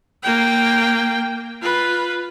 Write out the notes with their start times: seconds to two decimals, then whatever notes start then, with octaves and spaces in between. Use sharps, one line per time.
0.23 A#3 G5
1.62 F4 B4